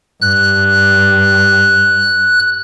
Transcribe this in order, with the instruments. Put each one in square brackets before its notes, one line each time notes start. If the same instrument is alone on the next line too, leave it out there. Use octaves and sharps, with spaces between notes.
[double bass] G2 [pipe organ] F#6